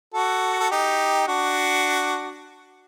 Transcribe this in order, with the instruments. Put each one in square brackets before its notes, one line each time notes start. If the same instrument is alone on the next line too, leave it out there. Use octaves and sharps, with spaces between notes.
[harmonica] F#4 A4
A4
D#4 G4
D4 F#4